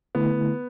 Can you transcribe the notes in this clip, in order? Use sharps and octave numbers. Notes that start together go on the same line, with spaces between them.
D3 A3 B3 E4